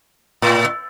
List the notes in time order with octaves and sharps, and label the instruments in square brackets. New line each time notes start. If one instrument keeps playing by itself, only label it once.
[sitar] A2